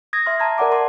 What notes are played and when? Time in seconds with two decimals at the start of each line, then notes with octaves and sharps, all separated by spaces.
0.13 D#6 G#6 A#6
0.26 E5 C6 F6
0.40 A5 A#5 G#6
0.58 A#4 D5 F#5 D6
0.72 A5 C6